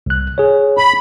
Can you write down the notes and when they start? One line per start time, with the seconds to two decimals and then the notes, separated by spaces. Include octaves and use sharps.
0.06 C2 F#6
0.38 G#4 C#5
0.78 B5